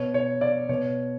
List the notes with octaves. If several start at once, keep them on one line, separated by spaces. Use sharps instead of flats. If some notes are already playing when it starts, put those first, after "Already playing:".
Already playing: B2 C#5
C#5
D5
B2 C#5